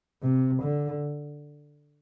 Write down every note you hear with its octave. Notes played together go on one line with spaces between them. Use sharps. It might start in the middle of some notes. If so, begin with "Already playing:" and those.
C3
D3